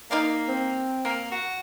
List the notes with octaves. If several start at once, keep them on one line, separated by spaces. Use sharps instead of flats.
A#3 D#4 D5 F5
C4
A#3 A#4
F#4